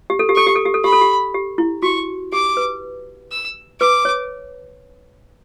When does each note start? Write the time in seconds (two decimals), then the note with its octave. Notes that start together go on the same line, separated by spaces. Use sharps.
0.10 G4
0.19 A4
0.29 G4
0.35 A4 C#6
0.47 G4
0.55 A4
0.66 G4
0.74 A4
0.84 G4 B5
0.93 A4
1.01 G4
1.34 G4
1.58 E4
1.83 F#4 C#6
2.32 G4 D6
2.57 B4
3.31 E6
3.80 B4 D6
4.05 C#5